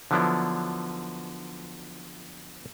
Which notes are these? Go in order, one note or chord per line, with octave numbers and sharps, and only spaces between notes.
D3 F3 F#3 B3 D4 E4